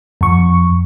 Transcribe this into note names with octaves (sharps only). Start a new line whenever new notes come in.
F2 C#6